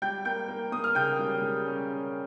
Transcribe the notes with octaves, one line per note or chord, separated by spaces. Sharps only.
G3 G5 G6
A#3 G5 G6
A#3
A#3 D#6
F6
C#3 G5 G6
G3
G3
C#4